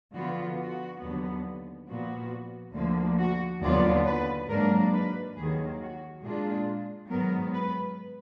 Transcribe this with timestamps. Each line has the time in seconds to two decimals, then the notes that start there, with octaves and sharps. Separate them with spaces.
0.14 D3 F3 B3 F4 F#4
0.59 F#4
1.02 D#2 D3 F#3 B3
1.89 A#2 F3 B3 F#4
2.75 D2 D3 F3 A#3
3.19 F#4
3.63 D#2 D3 F#3 B3 F4 D5
4.06 B4
4.49 G#2 F#3 A#3 D4 A#4
4.93 B4
5.36 D#2 D#3 F#3 G#4
5.81 F#4
6.24 A#2 G#3 D4 F4 G#4
7.11 G#2 D#3 F#3 B3 A#4
7.54 B4